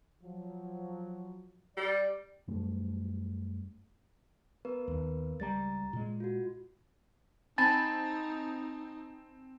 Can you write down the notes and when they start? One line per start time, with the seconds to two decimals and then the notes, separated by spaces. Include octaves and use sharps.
0.23 F3 F#3
1.77 G3 D5
2.48 F#2 G3 A3
4.65 B3 A#4 B4
4.88 D#2
5.40 C#2 G3 A#5 A6
5.93 A#2 G#3
6.20 F4 F#4
7.58 C4 D#4 G#5 A5 B5 A6